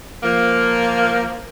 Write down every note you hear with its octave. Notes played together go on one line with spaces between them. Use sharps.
F3 A#3